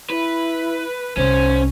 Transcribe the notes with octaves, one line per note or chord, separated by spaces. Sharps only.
E4 B4
C2 C#4 C5